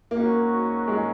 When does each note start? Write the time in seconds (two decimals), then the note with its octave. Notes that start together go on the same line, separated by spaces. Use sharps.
0.11 G#2 F#3 A#3 C#4 F#4 A#4
0.88 G#3